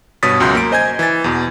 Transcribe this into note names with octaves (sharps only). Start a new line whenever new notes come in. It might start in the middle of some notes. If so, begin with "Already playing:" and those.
G2 B2 C#5 D#6 A6 B6
C#2 F#2 F#3 C6 G6
A#3 D7
C5 D#5 G#5 G6 G#6
E3 A6
E2 B2